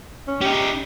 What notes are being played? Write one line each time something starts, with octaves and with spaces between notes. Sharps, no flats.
C#4
C#4 D#4 G4